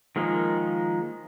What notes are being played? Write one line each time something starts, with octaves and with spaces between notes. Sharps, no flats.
D#3 F3 G#3 A#3 D#4